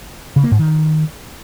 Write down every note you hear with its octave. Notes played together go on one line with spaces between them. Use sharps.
C#3
A#3
G#2
D#3